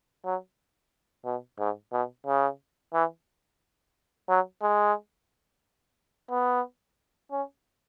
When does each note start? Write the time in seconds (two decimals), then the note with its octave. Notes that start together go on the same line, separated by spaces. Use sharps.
0.25 F#3
1.25 B2
1.59 G#2
1.92 B2
2.27 C#3
2.94 E3
4.29 F#3
4.62 G#3
6.30 B3
7.32 C#4